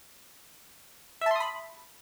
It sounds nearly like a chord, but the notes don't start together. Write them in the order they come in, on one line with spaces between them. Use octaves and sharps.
E5 A5 C6 D#6 B5